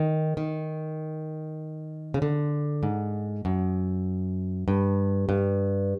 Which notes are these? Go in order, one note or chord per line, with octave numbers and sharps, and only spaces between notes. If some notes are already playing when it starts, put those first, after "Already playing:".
Already playing: D#3
D#3
C#3
D3
G#2
F#2
G2
G2